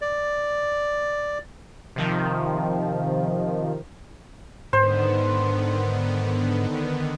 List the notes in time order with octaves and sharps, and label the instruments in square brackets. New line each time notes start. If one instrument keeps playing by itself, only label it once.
[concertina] D5
[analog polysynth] C3 D#3 F3
[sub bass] G#2 [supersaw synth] D3 D#3 B3 [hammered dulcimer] C5